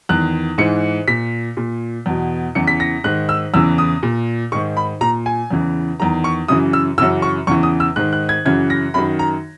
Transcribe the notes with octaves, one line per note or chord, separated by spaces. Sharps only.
E2 D#3 F#6
G#2 E3 C#7
A#2 B6
A#2
E2 B2
E2 C#3 E3 C#7
B6
A#6
G#2 D#3 F#6
E6
E2 C#3 E3 E6
D#6
A#2
G#2 D#3 C#6
B5
A#2 A#5
G#5
E2 C#3 E3
E2 D#3 A#5
C#6
F#2 C#3 E3 D#6
E6
F#2 C#3 E3 E6
C#6
E2 C#3 E3 C#6
D#6
E6
G#2 D#3 F#6
F#6
G#6
F#2 C#3 E3 G#6
A#6
F#2 D#3 B5
A#5